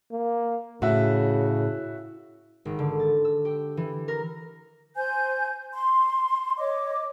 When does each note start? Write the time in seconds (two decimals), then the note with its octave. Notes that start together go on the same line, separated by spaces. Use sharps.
0.12 A#3
0.82 A2 C#3 F#4 E5
2.65 G#1
2.79 D3
3.00 A6
3.25 E6
3.45 G4
3.77 E3
4.08 A#4
4.96 C5 G#5 G6
5.73 C6
6.58 C#5 D#5 D6